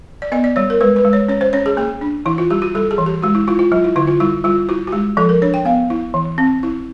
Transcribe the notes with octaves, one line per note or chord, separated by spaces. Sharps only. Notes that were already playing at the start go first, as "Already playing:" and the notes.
D5
B3 D#5
D5
G3 C#5
A#4
G#3 B4
B4
G#3
C#5
C#4 C#5
C5
C#4 C#5
G#4
A#3 G#4
D4
E3 E4
F4
G3 G4
F#4
G3 A4
G#4
E3
G4
G#3 F#4
E4
E4 F4
F4
F#3 F4
E4
D3 E4
F4
G3 E4
G3 F4
E4 F#4
F#4
G#3 G4
F3 A4
A#4
D4 C#5
G5
B3 F5
E4
E3
C4
E4